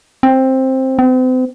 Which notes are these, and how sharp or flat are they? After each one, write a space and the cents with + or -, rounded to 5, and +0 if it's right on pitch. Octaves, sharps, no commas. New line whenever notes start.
C4 +10
C4 -40